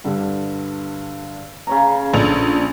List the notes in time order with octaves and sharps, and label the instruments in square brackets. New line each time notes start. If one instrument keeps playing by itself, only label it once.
[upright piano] G2 D3 G3
[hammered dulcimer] C#3 C#5 A#5
[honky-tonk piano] A#1 F7 [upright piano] D4 A4